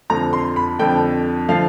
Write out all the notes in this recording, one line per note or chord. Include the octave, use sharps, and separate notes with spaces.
F2 D3 F3 A#5
C6
B5
F2 D3 F3 G5
D3 F3 F5